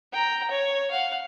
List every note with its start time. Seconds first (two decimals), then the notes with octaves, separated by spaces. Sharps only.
0.13 G5 A#5
0.51 C#5
0.91 F5 F#5